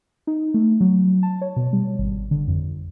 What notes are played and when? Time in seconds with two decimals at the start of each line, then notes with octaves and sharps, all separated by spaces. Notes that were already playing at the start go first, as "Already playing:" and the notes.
0.27 D#4
0.54 A3
0.81 F#3
1.23 A5
1.41 C#5
1.56 B2
1.73 G3
1.99 G#1
2.31 D3
2.48 F2